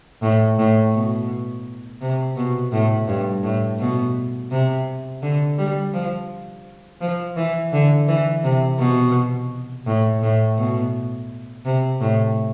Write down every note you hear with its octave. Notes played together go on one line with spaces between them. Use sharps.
A2
A2
B2
C3
B2
A2
G2
A2
B2
C3
D3
G3
F3
F3
E3
D3
E3
C3
B2
A2
A2
B2
C3
A2